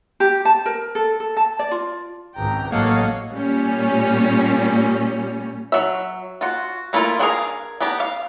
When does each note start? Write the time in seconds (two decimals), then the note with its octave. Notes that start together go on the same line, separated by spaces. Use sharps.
0.20 G4
0.45 A5
0.66 A#4
0.95 A4
1.20 A4
1.37 A5
1.59 D5
1.71 F4
2.36 G#1 C#2 G5 A#5
2.72 A1 F#3 A#3 A4 C#5 D#5 F5 F#5
3.31 A#2 G3 C#4
5.72 F#3 E5
6.41 F4 F#4
6.93 A3 A#3 E4 F4
7.19 D4 F#4 G#4 A#4 F5
7.81 B3 D4 G4 A#5
8.00 F5